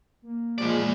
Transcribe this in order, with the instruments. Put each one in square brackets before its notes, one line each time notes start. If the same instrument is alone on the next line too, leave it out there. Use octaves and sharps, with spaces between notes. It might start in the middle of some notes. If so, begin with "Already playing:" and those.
[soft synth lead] A#3
[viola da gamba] A#2 F3 [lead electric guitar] E3 D5 [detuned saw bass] G#3